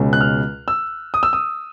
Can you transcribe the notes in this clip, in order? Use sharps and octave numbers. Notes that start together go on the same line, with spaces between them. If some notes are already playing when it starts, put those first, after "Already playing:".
Already playing: C#2 B2 G#3 C#4
F#6
F6
E6
D#6
E6
D#6